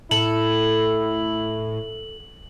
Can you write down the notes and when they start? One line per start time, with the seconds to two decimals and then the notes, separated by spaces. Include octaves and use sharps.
0.11 A2 E4 A4 F#7